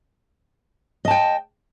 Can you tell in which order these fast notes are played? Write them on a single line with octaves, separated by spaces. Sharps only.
D#5 A5 G5